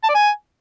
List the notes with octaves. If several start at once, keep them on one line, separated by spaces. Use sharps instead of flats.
A5
D5
G#5